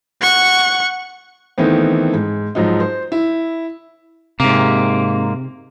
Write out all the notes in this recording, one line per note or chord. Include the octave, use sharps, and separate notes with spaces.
F#5 C#6
D#3 E3 A3 B3 C4
G#2
G#2 F3 F#3 D#4
C5
E4
G#2 C3 A#3